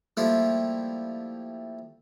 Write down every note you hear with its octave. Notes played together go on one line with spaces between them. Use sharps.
F3 G3 A3 A#3 E4 F4